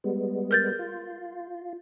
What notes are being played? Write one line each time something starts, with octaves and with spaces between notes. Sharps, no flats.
G3 G#3 B3
A#4 G6 A6
F4